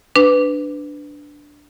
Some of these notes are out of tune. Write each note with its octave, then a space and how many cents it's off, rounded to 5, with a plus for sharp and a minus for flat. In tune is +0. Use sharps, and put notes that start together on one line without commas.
D4 +0 B4 +15 D6 +0